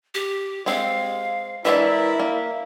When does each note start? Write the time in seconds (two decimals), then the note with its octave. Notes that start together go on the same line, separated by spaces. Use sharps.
0.14 G4
0.66 G#3 C4 F5
1.65 E3 G#3 D4 E4 A#4 E5
2.20 A#3